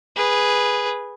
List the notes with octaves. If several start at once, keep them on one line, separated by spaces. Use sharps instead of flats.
G#4 B4